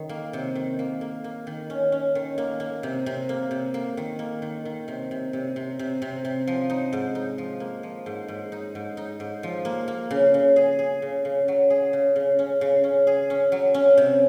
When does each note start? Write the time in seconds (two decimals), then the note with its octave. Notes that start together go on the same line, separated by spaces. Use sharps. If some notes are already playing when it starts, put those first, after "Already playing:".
Already playing: D#3
0.09 A#3
0.33 C3
0.55 D#3
0.79 A#3
1.01 A#3
1.24 A#3
1.47 D#3
1.70 C#4
1.92 C#4
2.15 D#3
2.38 A#3
2.60 A#3
2.83 C3
3.06 C3
3.29 A#3
3.51 C3
3.74 A#3
3.97 D#3
4.19 A#3
4.42 D#3
4.65 D#3
4.88 C3
5.11 C3
5.33 C3
5.56 C3
5.79 C3
6.02 C3
6.25 C3
6.47 F3
6.70 D#4
6.93 G#2
7.15 D#4
7.38 F3
7.60 A#3
7.83 F3
8.06 G#2
8.28 G#2
8.52 D#4
8.75 G#2
8.97 D#4
9.20 G#2
9.43 F3
9.65 A#3
9.88 A#3
10.11 C#3
10.34 C#3
10.56 G#4
10.79 G#4
11.02 C#3
11.25 C#3
11.48 F#3
11.70 G#4
11.93 C#3
12.16 C#3
12.39 C#4
12.61 C#3
12.84 C#4
13.07 G#4
13.30 C#4
13.52 F#3
13.74 C#4
13.97 C3